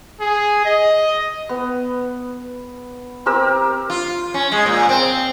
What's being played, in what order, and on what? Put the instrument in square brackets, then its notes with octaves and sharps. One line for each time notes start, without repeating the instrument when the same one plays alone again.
[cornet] G#4
D#5
[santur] B3
C4 G4 A#4 E6
[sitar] F4
C#4
G#3
A#2
C4